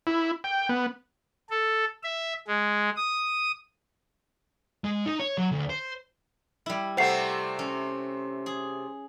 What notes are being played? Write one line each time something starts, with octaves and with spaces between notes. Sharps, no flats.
E4
G5
B3
A4
E5
G#3
D#6
G#3
D#4
C#5
F#3
D2
C5
G3 E4
C3 A3 C4 C5 F#5 C7
C#4
G#4